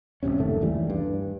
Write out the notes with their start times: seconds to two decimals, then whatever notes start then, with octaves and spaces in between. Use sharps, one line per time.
0.23 D1 A#1 C3 C#4
0.38 F#1 D#3 A3
0.61 D#2 E3 G3
0.90 G2